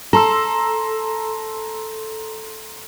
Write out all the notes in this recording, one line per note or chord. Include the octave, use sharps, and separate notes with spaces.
A4 A#5 C6 E6